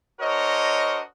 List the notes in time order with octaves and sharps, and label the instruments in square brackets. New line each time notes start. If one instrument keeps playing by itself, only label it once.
[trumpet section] D4 F#4 A#4 C5 C#5 D#5